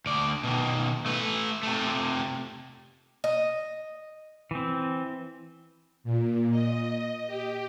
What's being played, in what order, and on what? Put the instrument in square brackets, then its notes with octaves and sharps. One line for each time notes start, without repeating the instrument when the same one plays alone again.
[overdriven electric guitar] D2 D5
B2 D#3
A3 B4
C3 A3
[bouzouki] D#5
[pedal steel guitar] E3 C4
[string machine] A#2
D#5
G4